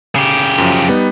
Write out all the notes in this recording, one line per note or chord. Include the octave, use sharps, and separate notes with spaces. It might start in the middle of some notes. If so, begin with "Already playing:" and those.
C#3 G4
F#2 F3
G3 B3 D#4